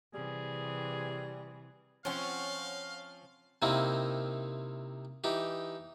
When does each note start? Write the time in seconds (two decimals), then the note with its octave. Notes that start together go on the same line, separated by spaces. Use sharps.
0.14 C3 E3 G3 G#4
2.05 F3 C4 C#4 C#5 F5 F#5 C6
3.62 C3 D#3 A#3 C4 D#4 E4
5.24 E3 D#4 G4